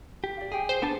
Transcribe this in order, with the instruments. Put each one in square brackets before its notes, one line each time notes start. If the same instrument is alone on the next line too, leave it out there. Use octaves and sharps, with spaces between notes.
[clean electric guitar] G4
[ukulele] D5 F5
[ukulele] G4 G5 G#5 [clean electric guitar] G#4
[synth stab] C5
[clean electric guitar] B3 D4 A5 [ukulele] G#4